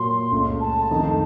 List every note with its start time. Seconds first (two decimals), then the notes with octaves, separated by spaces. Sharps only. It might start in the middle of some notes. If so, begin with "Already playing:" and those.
Already playing: A#2 F#3 A#3 C6
0.32 C#2 C#3 A3
0.61 A5
0.90 F2 D#3 A3 D#4